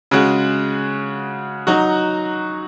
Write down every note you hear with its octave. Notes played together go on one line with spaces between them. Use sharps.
C#3 G#3 F#4
F#3 D#4 F#4